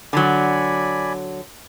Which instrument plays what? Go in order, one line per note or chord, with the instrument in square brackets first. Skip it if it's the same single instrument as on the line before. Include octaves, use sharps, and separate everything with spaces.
[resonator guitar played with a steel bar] D3 F#3 [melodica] D5 G#5 B5